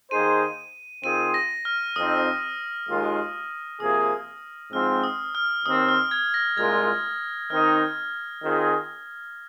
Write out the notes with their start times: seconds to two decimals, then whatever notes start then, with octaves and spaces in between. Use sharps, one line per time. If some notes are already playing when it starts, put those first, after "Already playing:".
0.11 D#3 A#3 D#4 G#4 C5 D#7
1.03 D#3 C4 F4 G#4 C5 D#7
1.34 A#6
1.65 F6
1.96 F2 F3 C4 D#4 D#6
2.88 D#2 D#3 G#3 F4
3.80 C3 F3 A#3 G#4 D#6
4.73 G#2 F3 C4 F6
5.04 D#6
5.35 F6
5.66 D#2 D#3 C4 D#6
5.89 F6
6.11 G#6
6.34 A#6
6.57 C2 A#2 G#3 F4 A#4 G#6
7.50 D#3 C4 D#4 F6
8.42 D#3 C4 F4 G#4